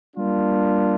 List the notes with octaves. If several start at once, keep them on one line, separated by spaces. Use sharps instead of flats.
G3 A#3 D4 F4